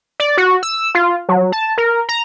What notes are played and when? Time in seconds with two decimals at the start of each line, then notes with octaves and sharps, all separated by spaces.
0.20 D5
0.38 F#4
0.63 E6
0.95 F4
1.29 F#3
1.52 A5
1.78 A#4
2.09 A#5